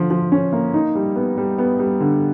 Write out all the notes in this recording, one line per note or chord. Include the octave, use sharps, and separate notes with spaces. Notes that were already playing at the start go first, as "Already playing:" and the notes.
Already playing: D3 F3
F3
C#4
A#3
D#4
G3
B3
G3
B3
G3
D3